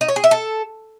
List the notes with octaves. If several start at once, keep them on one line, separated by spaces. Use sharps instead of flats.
D#4
C#5
G#4
E5
A4